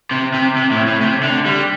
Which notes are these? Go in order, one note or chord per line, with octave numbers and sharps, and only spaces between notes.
C3
C3
C3
A2
A2
C3
D3
G3